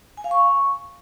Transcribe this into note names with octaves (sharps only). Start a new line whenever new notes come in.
G#5
F5
C#6